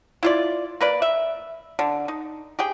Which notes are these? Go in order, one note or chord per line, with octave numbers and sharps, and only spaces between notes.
E4 F4 D5
A#3 B4 D5
E5
D3
D#4
G4 G#4 G5